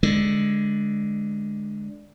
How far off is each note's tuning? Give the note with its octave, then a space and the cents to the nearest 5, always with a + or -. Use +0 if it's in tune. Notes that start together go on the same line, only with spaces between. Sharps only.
D3 +0 G#3 +0